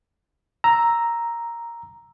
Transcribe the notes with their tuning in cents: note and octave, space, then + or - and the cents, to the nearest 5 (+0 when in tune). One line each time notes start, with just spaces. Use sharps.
A#5 +0 E6 +0